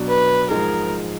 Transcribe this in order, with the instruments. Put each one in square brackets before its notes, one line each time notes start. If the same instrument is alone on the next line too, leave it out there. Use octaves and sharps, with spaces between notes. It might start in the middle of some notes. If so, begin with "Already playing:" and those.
Already playing: [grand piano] B2 F#3 D4
[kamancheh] B4
[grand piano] G#2 F3 G#3 D#4 G#4 [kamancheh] A#4